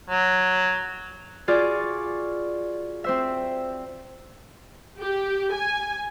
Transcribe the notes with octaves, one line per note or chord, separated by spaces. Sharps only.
F#3
F4 F#4 G#4 D5
C4 C5 E5
G4
G#5